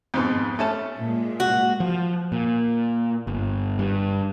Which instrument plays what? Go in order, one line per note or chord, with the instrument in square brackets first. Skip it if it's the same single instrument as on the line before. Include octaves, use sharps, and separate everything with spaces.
[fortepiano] F2 G#2 B2
A3 C#4 A5
[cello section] A#2 G#3
[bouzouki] F#4
[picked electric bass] F3
A#2
G1
G2